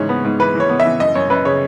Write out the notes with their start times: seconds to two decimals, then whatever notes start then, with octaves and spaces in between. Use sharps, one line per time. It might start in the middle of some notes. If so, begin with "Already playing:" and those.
Already playing: G#2 C#3 E3 C#5
0.09 B3
0.25 G#2
0.39 E3 B4
0.55 E3
0.60 C#5
0.69 B3
0.80 E5
0.85 E3
1.00 F#2 D#5
1.15 F#2 C#5
1.30 F#2 B4
1.45 C#3 C#5